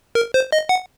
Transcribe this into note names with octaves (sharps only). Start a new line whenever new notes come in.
A#4
C5
D#5
F#5